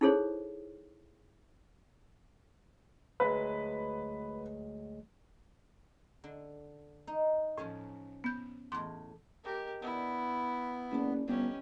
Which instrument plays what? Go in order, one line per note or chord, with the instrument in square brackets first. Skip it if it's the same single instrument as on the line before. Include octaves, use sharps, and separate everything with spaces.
[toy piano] D#4 E4 G#4 A4 C5 C#5
[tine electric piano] D2 F#3 G#3 [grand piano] B4
[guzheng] D3
D#4
[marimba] A2 [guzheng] F3 C#4 G#5
[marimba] B3 G6
[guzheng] E2 A2 [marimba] C6 D6
[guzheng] F3 G#3 [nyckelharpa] G4 A#4
[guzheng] E2 D4 [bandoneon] B3 [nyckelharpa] E4
[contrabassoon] F#1 [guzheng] B2 G3 D4
[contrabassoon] G1 [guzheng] E3 B3 D#4 [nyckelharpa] C#4 G4